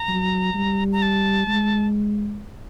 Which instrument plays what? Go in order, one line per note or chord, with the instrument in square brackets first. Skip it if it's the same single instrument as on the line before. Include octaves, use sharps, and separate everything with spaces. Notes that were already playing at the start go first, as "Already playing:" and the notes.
Already playing: [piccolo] A#5
[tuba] F#3
G3
[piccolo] A#5
A5
[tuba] G#3